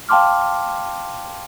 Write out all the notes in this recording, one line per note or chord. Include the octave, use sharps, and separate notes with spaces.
F5 G5 A5 C6 D6 F6